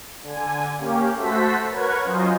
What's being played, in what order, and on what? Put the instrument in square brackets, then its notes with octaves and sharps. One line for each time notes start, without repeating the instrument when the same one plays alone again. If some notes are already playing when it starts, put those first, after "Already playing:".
[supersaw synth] D3 G#5
A#3 C#4 G4
A3 F#4 A4 C5 B6
A#4 B4 C#5 F#5 G#6
F#3 C#4 F4 C5 D#5